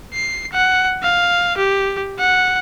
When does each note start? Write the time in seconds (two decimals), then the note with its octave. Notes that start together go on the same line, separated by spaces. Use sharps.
0.14 C7
0.52 F#5
1.03 F5
1.57 G4
2.19 F#5